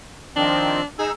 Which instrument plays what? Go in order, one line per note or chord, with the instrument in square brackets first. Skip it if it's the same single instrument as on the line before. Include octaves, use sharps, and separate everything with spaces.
[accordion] D#3 F3 C4 [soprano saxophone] D4
[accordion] D#4 E6 [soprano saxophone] G#4